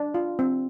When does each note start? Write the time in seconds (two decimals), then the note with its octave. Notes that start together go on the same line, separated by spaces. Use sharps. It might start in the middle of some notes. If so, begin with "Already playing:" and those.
Already playing: D4
0.14 F4
0.39 C4